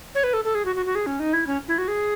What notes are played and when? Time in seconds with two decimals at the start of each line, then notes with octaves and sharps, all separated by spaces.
0.15 C#5
0.24 B4
0.34 A4
0.44 A4
0.55 G#4
0.65 F#4
0.76 F#4
0.86 F#4
0.95 G#4
1.06 C#4
1.20 D#4
1.33 E4
1.47 C#4
1.68 E4
1.78 F#4
1.88 G#4